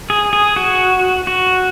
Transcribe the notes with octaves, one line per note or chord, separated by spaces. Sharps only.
G#4
G#4
F#4
F#4